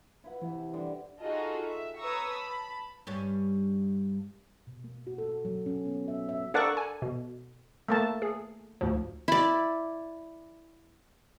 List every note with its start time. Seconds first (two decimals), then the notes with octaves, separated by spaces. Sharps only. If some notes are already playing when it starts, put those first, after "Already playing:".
0.24 E4 B4 F#5
0.41 C3 E3 E4
0.74 D3 G3 D5
1.22 D#4 F4 F#4 G#4 A4 D#5
1.67 E5
1.99 B4 C#5 A#5 C#6 D#6 E6
2.32 A5 B5
3.07 G2 G3 C#4
4.67 B2
4.84 A#3
5.07 F#4
5.18 A4
5.31 A4
5.45 F#3
5.66 C#4
5.85 B3
6.08 E5
6.29 E5
6.54 D4 A4 A#4 D5 F#5 C#6
6.77 G#5
7.02 B2
7.88 A3 A#3 A5
8.22 G#4
8.81 D2 G#2 F3
9.28 E4 D5